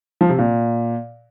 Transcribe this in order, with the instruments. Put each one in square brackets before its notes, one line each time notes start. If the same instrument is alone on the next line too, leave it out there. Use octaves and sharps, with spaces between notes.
[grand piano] F3
C3
A#2